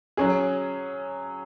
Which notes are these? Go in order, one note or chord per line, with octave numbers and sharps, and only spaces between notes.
F#3 C#4 G#4